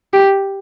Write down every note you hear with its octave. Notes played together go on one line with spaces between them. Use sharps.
G4